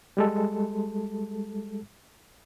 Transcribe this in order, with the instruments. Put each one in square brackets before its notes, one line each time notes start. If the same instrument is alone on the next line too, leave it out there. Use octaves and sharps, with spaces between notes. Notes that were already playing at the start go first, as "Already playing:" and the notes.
[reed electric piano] G3 G#3 A4